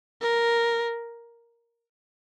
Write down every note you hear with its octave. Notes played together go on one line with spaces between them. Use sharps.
A#4